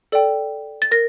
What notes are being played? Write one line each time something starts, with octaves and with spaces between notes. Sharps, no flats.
A4 D5 G5
A6
A#4 A#6